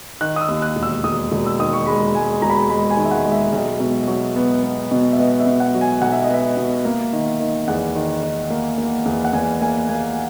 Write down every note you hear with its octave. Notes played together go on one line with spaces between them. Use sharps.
D#3 F#6
D#6
E6
D#2
F#6
E1
E6
E1 D#6
E1
E6
D#3 D#6
C#6
G#3 B5
G#3 G#5
E1 A#5
B5
A#5
G#3 B5
G#5
D#3
E5
F#5
G#3
E5
B1
B2
F#3
B3
B3
B2
E5
B3 D#5
E5
B2
F#5
F#3
G#5
B1 F#5
E5
D#5
B3 E5
B2
A#3
D#3
D#3
E2 F#5
D#3
D#3
A#3
A#3
E2
F#5
E2 G#5
A#3 G#5
A#3 G#5